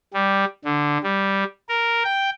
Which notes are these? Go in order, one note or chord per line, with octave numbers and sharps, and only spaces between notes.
G3
D3
G3
A#4
G5